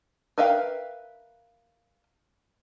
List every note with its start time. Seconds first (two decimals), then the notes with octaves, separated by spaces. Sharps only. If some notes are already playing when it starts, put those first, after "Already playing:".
0.38 A#4 B4 E5 F5 G5